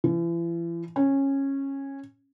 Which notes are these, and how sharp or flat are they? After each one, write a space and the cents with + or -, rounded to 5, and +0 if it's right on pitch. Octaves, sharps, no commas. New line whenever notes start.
E3 +40
C#4 -15